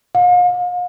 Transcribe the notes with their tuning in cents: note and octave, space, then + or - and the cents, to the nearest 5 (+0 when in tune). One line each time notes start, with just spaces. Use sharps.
F5 +40